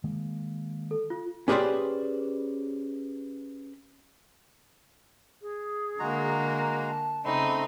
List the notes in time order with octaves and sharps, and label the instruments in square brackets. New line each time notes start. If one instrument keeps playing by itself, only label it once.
[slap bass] D#3 G#3 A#3
[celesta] A4
F4
[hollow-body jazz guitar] C#4 G4 G#4 B4 C5 D5
[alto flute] G#4
[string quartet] D3 A#3 [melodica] G#3 F#4 A#5
[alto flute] A5
[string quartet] C#3 D#4 [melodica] A3 C4 C6 [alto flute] B5